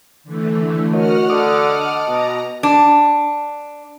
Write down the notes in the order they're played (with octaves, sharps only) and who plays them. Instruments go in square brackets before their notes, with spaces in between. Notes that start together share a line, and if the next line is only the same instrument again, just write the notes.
[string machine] D3 E3 A3
[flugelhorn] F#4 [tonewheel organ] A#4 C#5 D#5 [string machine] F#5 F6
[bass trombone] D3 [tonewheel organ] A5 D6 D#6
[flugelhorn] D#5
[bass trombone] B2 [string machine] A#5
[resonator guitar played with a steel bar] D4